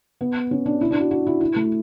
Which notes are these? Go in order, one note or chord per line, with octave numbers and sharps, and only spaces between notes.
B3
C#4
D4
E4
D4
F#4
F#4
E4
E4
A3